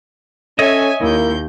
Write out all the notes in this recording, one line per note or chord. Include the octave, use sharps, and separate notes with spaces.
C#4 A4 C#5 D#5 E5 G#5
D#2 A#3 E4 G6